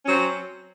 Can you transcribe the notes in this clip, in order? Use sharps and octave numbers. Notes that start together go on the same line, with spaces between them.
F#3 C4 C#4